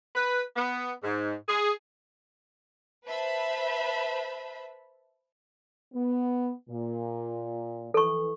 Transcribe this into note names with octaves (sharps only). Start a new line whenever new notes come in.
B4
B3
G#2
G#4
B4 C5 E5 A5 B5
B3
A#2
E3 A4 C#6